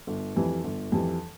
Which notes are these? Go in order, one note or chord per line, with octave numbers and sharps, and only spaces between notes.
G1
F2 E3 G3
G1
F2 E3 G3